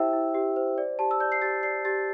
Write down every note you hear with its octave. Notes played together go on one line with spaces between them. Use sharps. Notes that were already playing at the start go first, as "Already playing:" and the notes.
Already playing: E4 G4 C5 E5 G5 E6
E4
G4
C5
D5
G4 A5
E6
D5 G6
C7
G4 A6
D5 C7
G4 A6